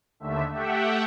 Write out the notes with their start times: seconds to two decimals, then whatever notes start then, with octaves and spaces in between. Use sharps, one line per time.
0.20 D#2 D3 A3 E5
0.52 A3 G4 E5 F#5 G5